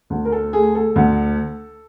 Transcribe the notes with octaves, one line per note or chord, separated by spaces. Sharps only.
D2
A#4
A4
A3 G#4
A4
D2